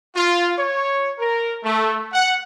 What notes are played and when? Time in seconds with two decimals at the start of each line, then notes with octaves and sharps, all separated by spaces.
0.16 F4
0.58 C#5
1.19 A#4
1.64 A3
2.13 F#5